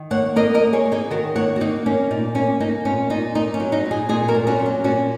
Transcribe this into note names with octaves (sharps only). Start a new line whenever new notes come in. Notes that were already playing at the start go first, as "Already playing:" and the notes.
Already playing: D#3
A#3 C#5 F#5
A#3 A#4 D#5
A#4 D#5
A#3
G#4 C#5
A#3
D#4 G#4
D#3 F#4 A#4
A#3 C#5 F#5
F#4
A#3 D#4
A#3 C#4
A#2 D#4
A#3 C#4
A#3 D#4
A#2 C#4
A#2 D#4
A#3 D#4
C#4
F#3
D#4
A#2
D#4 G#4
A#2 D#4 G#4
F#4 A#4
A#2
C#4 F#4
F#3
C#4
A#2 C#4 F#4